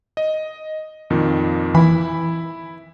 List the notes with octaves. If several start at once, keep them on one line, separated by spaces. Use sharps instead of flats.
D#5
F2 A#2 D#3
E3 E4 B5